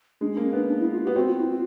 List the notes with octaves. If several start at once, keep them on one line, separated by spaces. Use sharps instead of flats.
G#3 D4
D4
A#3
C#4
B3 D4
D4
E4
F4
G4
B3
C4 F#4
F4
E4
F4